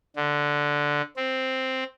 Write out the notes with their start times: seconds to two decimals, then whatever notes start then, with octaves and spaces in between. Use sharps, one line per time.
0.16 D3
1.17 C4